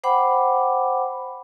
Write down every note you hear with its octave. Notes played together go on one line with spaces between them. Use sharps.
C5 F#5 G5 B5 D6